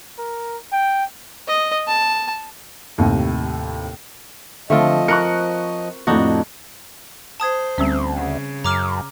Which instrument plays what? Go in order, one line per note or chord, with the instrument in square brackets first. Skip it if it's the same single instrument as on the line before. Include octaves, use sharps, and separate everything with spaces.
[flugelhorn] A#4
G5
[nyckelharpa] D#5
A5
[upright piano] D#2 A2 C3
[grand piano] D3 [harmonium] F3 D#5 [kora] A3 C4 F4
[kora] A#4 [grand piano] C#6 F#6 C#7
[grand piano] F2 A2 [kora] D4 D#4 F#4
[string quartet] C5 [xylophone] A5 D#6 G#6
[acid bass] D2 [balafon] G3 C4 C#4
[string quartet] C#3
[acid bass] F#2 [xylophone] A#5 D6 F6